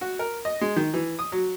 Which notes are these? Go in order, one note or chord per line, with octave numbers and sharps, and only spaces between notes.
F#4
A#4
D#5
G#3
D#3
E3
D#6
F#3